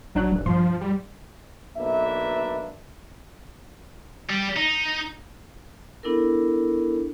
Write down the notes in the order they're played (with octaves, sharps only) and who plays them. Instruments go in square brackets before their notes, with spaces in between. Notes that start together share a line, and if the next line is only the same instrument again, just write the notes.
[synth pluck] A1 D4 F#6 [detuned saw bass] F#3
[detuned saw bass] D#1
[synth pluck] G2 B2 C6 [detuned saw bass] F3
[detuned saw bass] G3
[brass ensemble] B1 A#3 D4 B4 E5
[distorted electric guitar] G3
D#4
[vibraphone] B3 D4 E4 A4 A#4